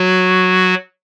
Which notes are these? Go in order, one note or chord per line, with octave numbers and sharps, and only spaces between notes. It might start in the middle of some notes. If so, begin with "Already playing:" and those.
Already playing: F#3 F#4